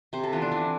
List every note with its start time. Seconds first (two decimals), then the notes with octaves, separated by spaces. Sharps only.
0.13 C3 C5
0.24 A4
0.32 E3 B3 F4
0.42 D4
0.52 E3 C4